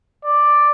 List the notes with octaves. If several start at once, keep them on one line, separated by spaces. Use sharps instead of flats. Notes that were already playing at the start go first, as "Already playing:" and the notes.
D5